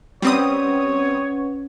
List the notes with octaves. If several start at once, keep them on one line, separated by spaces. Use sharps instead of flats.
G3 C4 C#4 B4 C#5 F#5 D#6